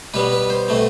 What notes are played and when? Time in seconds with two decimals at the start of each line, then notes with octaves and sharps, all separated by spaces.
0.14 B2 G3 B3 B4
0.32 B4
0.50 C5
0.68 B2 A3 C4